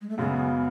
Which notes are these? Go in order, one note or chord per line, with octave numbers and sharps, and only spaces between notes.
G#3
A3
F#2 C#3 G#3 B3